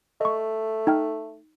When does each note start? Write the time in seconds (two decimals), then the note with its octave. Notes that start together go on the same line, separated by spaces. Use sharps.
0.21 A3 D#5 C#6
0.87 D#4 G5 F6